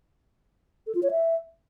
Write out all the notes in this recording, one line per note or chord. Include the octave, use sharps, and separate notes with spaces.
A4
F4
C#5
E5